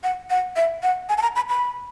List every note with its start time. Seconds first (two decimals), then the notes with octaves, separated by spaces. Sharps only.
0.04 F#5
0.30 F#5
0.56 E5
0.83 F#5
1.09 G#5
1.18 A5
1.22 A#5
1.36 B5
1.49 B5